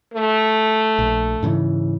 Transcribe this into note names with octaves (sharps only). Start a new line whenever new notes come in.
A3
A#1
G#2 C#3 E3